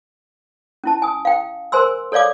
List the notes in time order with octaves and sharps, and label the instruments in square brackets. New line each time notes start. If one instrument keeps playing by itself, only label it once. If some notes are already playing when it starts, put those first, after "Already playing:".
[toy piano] C#4 E4 A5
G#5 D#6
F5 G5
A#4 C5 G#5 C6 E6
A4 C#5 D5 F5 D6